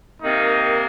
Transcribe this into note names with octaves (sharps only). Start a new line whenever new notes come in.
C3 D#3 A#3 D#4